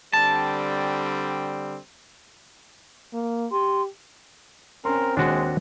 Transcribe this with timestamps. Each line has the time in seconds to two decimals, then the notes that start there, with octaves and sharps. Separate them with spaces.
0.13 D3 G3 C4 A5
3.14 A#3
3.52 G4 C6
4.85 C4 C#4 A#4 C6
5.17 D#2 G#3 D4 F#4